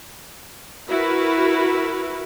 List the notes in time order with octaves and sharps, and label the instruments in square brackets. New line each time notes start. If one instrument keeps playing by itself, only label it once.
[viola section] E4 F#4 A#4 B4